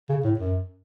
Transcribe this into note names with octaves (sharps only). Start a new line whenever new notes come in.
C#3
A2
F#2